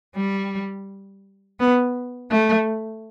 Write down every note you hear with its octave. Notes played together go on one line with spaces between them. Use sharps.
G3
B3
A3